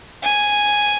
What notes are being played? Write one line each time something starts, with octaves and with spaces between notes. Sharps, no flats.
G#5